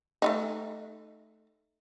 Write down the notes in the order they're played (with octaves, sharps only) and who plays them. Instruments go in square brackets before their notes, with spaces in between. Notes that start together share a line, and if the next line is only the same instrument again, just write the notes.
[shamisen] A3 D4 D#4